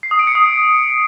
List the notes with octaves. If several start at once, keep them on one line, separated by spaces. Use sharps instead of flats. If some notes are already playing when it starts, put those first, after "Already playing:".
C7
D#6
D7
C#7
D#6